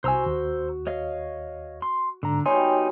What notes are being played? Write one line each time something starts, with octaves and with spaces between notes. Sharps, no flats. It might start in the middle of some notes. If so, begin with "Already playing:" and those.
C2 F#4 C5 G#5 A#5 E6
D#2
C#5 D#5 F5
C6
G#2 D3 A#5
B2 G3 D#4 G4 C#5 G#5 C6